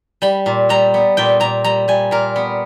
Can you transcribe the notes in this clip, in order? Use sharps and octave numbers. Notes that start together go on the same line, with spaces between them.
G3 B5
A#2
G3 A#5
B3
A#2 G5
A#2 A#5
G3 A#5
G3 G#5
A#2 A#4
B3